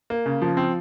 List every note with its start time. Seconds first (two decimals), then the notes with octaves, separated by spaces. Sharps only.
0.10 A#3
0.26 C#3
0.42 F3
0.57 C4